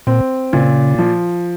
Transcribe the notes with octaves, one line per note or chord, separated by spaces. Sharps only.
A#2 C4
A#2 C#3
F3